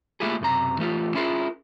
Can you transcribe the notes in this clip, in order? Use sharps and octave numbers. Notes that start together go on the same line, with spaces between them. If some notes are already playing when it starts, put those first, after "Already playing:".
A3 A#3 E4 F4 G4 G#4
B1 F#2 C3 A#5
E3 A3 F4 G4
C#4 E4 F4 G#4 A#4